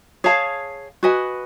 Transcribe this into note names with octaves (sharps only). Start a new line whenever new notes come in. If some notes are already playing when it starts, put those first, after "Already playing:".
G#4 C#5 F5 A5
F#4 B4 D#5 G#5